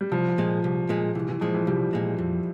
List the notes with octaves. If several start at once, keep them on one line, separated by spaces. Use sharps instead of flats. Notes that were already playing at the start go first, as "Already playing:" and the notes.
G3
C2 F3
A#2 G#3
C2
A#2 G#3
C2 E3
E3
A#2 F3 G#3
E3
C2 G3
A#2 G#3
F2